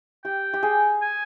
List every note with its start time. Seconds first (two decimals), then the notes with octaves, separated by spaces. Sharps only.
0.25 G4 G5
0.53 G4
0.63 G#4
1.01 G#5